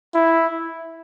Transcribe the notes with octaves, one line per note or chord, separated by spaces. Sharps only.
E4